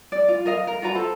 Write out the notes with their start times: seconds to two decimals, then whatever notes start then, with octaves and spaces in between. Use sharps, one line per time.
0.12 D5
0.28 F4
0.46 A#4 D#5 F5
0.67 A#4
0.82 F4 F#4 B4 A#5
0.95 A4 C5